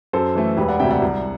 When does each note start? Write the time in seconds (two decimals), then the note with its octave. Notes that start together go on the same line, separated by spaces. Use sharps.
0.13 F#2 A4 C5
0.35 E3 A3
0.57 E1 G4 B4
0.68 D5 F#5
0.80 D2 C3 E5 G5
0.91 D5 F#5
1.02 C2